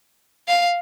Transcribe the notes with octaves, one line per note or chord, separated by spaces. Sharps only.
F5